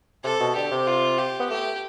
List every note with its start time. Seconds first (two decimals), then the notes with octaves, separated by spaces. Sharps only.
0.24 C3 A4
0.40 B2
0.56 D3 G4
0.72 C3
0.87 F4
1.18 G4
1.40 B3
1.50 A3 G4